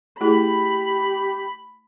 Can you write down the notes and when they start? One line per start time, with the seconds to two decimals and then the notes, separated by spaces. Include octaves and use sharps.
0.21 A3 E4 G4 G#4 B5